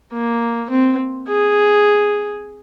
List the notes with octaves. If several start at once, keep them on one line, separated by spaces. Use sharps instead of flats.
A#3
C4
G#4